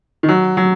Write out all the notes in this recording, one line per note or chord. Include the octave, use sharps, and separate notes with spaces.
D#3
F#3
F#3